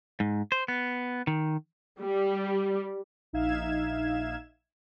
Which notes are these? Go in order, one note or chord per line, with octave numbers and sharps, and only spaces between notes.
G#2
C5
B3
D#3
G3
A#1 D#4 E5 F5 G#6 E7